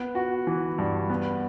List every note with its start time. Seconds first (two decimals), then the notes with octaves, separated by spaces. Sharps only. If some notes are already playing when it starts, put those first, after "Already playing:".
Already playing: B3
0.15 F#4
0.47 E3
0.78 G2
1.10 B3